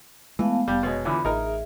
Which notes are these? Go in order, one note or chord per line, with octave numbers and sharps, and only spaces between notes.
E3 G#3 A3 B3 F5 A5
F1 G3
B2 G#3 C#5
E2 D3 E3 F4 B5
A1 D#4 G#4 A#4 E5